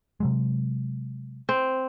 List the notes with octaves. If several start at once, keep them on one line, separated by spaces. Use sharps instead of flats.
C3 F#3 G#3
C4